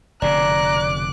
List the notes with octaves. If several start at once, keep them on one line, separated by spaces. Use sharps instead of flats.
F1 B2 D3 D5 A#5 D6 F#6